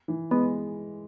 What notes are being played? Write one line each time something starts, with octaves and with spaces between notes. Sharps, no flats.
E3
G#3 B3